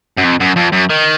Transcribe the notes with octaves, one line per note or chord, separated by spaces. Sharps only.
F#2
F2
F#2
F2
F#2
D#3